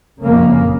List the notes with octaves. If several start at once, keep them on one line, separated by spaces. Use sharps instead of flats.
F#1 F2 C#3 A#3